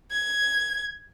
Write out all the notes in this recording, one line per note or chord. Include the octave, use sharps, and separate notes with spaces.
G#6